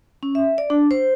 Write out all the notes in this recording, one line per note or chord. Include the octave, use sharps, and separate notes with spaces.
C#4
E5
D5
D4
C5